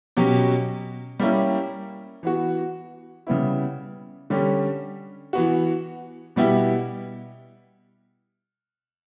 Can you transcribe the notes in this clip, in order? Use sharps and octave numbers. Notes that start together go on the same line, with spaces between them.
B2 F#3 C#4 G4
G3 A#3 C#4 E4 G4
E3 B3 F#4
C#3 G3 B3 E4
D3 G3 C#4 G4
E3 B3 F#4
B2 G3 B3 E4 G4